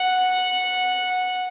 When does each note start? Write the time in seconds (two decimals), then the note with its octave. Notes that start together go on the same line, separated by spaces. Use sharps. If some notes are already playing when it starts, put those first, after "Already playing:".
Already playing: F#5